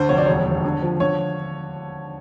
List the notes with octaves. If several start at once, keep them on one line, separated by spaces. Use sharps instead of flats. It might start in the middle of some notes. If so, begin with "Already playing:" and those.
Already playing: D2 D3 C5
F1 C#5
D5
E1 C#5
D#2
D3
F3
D3 C#5